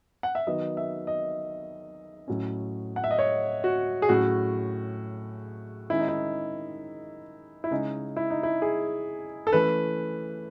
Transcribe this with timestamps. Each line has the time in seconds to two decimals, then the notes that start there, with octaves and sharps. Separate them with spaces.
0.23 F#5
0.35 E5
0.47 D#3 F#3 B3 D#5
0.77 E5
1.07 D#5
2.28 A2 F#3 C#4
2.96 F#5
3.04 E5
3.11 D#5
3.19 C#5
3.64 F#4
4.02 G#4
4.09 A2 F#3 C#4 F#4
5.90 D#3 G#3 C#4 E4
5.99 D#4
6.08 E4
7.64 E4
7.71 C#3 G#3 C#4 D#4
8.17 E4
8.30 D#4
8.43 E4
8.62 G#4
9.47 A4
9.53 E3 A3 C#4 B4